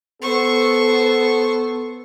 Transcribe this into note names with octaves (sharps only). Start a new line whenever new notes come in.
B3 A4 C5 C#6